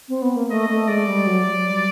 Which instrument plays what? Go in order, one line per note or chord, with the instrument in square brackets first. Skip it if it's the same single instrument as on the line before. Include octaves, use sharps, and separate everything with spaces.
[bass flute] C4
B3
A#3
[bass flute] A3 [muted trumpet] D#5
[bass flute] A3
[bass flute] G#3 [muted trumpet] D5
[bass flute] G3
F#3
F#3
F#3
G3